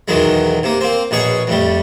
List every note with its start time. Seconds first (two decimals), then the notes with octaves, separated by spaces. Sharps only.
0.08 B1 E2 D#3 F#3 G#3
0.63 C3 A#3
0.81 A#3 C4
1.11 A#1 B2 G#4 C#5
1.47 F2 A2 G3